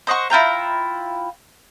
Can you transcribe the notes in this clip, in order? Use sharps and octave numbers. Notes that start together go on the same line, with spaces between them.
C5 D#5 F#5 C#6
E4 F4 G5 A#5